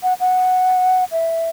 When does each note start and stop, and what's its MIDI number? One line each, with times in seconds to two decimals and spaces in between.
0.03 0.14 78
0.20 1.04 78
1.12 1.50 76